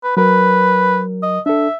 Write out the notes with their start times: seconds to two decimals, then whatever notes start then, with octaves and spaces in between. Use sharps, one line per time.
0.03 B4
0.17 F#3 A#4 B4
1.23 D#5
1.46 D4 A4 E5